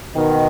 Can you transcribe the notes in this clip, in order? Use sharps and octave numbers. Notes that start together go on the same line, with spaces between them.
B2 D#3